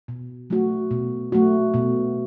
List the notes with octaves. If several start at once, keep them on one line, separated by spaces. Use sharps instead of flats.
B2
F#3 A3 F#4
B2
F#3 A3 F#4
B2